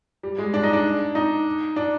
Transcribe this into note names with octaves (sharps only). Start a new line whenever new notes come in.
G3
G#3
D4
D#4
D4
D#4
D4